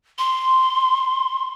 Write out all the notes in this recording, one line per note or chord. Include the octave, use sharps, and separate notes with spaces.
C6